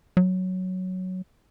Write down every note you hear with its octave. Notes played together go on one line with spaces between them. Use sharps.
F#3